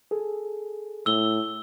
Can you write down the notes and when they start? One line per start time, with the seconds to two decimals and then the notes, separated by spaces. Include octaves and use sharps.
0.11 G#4 A4
1.06 A2 E6 G7